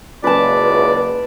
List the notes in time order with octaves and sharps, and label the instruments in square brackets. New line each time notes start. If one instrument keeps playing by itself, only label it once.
[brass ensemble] F#1 C#2 [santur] B4 A5 [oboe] D5